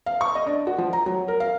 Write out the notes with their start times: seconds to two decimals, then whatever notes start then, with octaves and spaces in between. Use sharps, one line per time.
0.06 F5
0.21 C#6
0.35 D#5
0.46 D4
0.67 F#4
0.78 F3
0.93 A#5
1.06 F#3
1.28 A#4
1.40 F5